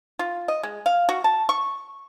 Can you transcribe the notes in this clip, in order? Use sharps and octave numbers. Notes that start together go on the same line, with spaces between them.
F4
D#5
G#3
F5
F#4
A5
C#6